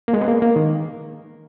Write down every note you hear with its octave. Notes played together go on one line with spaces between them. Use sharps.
A#3
G#3
B3
A#3
A#3
D#3